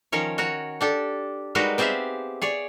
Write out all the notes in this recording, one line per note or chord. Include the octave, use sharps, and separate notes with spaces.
D#3 F3 C#4 A#4 C#5
F#4 A#4 C#5 F#5
D4 G4 A4
G3 G#3 D#4 F#4 A#4 B4
B3 C4 G4 G#4 E5 F5
G#4 C#5 D5